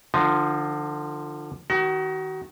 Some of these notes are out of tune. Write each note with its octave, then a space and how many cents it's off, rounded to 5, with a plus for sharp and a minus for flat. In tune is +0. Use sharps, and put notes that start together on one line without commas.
D3 +20 F3 -10 D#4 +0
D#3 +15 F#4 +35